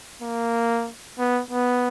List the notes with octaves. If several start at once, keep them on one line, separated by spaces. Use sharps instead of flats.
A#3
B3
B3